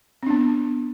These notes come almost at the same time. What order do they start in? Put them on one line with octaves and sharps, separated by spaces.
C4 D4 B3